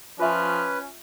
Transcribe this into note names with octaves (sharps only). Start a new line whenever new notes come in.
F3 C#4 F4 B4 E5